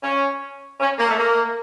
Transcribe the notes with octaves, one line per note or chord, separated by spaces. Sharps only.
C#4
C#4
A#3
A3
A#3